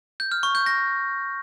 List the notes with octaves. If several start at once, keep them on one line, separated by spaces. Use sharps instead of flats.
G6
F6
C#6
G6
A#6